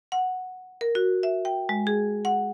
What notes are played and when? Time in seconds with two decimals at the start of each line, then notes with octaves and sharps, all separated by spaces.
0.12 F#5
0.81 A#4
0.95 F#4
1.23 E5
1.45 G5
1.69 G#3
1.87 G#4
2.25 F#5